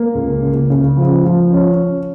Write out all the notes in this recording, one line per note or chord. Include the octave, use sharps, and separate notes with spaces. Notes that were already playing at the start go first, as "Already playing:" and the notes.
Already playing: A#3
C#2
C#3
C#3
F3
F3
C#4